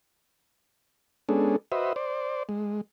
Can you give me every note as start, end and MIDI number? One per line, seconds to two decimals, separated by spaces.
1.29 1.56 56
1.29 1.56 59
1.29 1.56 61
1.29 1.56 62
1.29 1.56 68
1.29 1.56 69
1.72 1.93 66
1.72 1.93 71
1.72 1.93 72
1.72 1.93 75
1.72 1.93 76
1.96 2.43 72
1.96 2.43 74
2.49 2.81 56